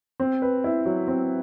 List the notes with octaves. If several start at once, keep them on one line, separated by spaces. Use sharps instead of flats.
C4
B4
E4
F#3
C4